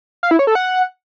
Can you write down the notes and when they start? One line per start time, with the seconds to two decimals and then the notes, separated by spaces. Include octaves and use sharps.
0.23 F5
0.31 E4
0.39 C#5
0.47 A4
0.55 F#5